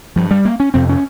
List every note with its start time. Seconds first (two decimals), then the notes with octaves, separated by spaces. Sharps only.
0.16 G2 F3
0.31 G3
0.45 A#3
0.60 C#4
0.74 F2 C3 C4
0.89 C#4